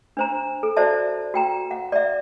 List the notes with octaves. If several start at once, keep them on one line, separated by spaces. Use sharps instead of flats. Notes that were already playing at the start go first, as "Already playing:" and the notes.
D4 C5 A#5
A4
F#4 C5 D5 E5 A5
F#4 G5 A#5
F#5
D5 E5